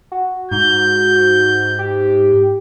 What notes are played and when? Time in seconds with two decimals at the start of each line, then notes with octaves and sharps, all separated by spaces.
0.12 F#4
0.51 G#2 G6
1.79 G4